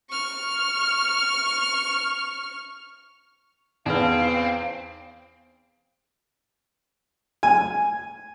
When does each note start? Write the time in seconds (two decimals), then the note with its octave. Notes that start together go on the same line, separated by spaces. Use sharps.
0.10 C#6 F6
3.86 E2 C4 D#4 B4 F5
7.43 G#5